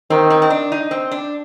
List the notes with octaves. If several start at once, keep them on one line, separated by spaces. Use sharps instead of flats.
D#3 C4
C4
C4
D4
D#4
C4
D4